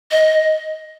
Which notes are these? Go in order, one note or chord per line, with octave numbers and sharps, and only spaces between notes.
D#5